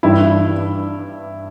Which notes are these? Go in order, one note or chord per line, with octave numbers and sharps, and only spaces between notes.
G2 E3 G3 E4